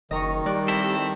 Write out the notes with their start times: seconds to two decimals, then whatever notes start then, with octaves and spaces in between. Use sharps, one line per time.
0.11 F#1 D#3 D#5 A#5 C#6
0.46 G3 A#4 D5 F#6
0.68 C4 E4 A4